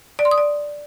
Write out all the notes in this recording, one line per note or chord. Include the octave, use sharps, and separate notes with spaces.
D5
C6
D#6
D5